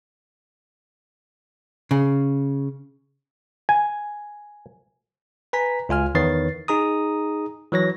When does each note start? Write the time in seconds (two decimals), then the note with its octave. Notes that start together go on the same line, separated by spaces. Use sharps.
1.91 C#3
3.69 G#5
5.53 B4 G#5 A#5 B6
5.89 C#2 F4 G#5 F6
6.15 E2 D#3 B4 C#5 A6 C7
6.68 D#4 G#4 A#5 D#6
7.72 E3 F#3 C#5 A#6